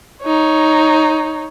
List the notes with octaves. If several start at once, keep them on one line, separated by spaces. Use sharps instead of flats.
D#4 C#5